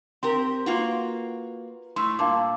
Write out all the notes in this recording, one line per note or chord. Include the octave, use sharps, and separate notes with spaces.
C4 G4 A#4 C6
A#3 F4 F#4 B4
A2 A3 C6 E6
G2 A#2 F5 A5 D6